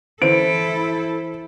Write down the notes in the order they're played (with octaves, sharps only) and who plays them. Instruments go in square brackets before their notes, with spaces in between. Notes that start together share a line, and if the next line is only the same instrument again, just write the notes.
[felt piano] E3 C5 D7 [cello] E4 A4